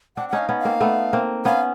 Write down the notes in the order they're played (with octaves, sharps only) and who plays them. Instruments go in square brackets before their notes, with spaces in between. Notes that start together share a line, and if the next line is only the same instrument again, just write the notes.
[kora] C4 D4 [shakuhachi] F#5
[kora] C#4 D#4 [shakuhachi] F#5
[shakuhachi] F5
[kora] B3 C#4
[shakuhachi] F5
[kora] A#3 C4
A3 B3
A#3 C4
[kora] B3 C#4 [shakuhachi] F5